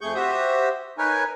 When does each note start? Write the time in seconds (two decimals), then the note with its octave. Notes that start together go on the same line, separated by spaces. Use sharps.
0.01 F2 A3 G#4 C#6 G6
0.15 F#4 G4 C5 E5 D#6
0.98 D#4 A#4 B4 C#5 G#5